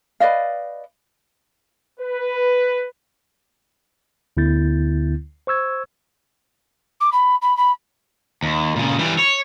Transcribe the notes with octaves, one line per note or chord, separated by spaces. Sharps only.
B4 D5 D#5 F5
B4
D2 D3 B3 E4 G6 A6
C5 C#6 E6 G#6
D6
B5
B5
B5
D#2
A#2 C#3
E3 G3
C#5